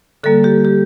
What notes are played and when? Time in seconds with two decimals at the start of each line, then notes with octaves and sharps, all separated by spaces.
0.24 D3 G3 A#3 A4
0.44 G4
0.65 G4